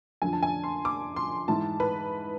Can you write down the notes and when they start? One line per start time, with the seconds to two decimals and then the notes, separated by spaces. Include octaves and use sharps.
0.22 F2 D3 F3 G#5
0.33 A5
0.43 G#5
0.64 C6
0.85 D6
1.16 C6
1.48 G#2 E3 A5
1.80 B4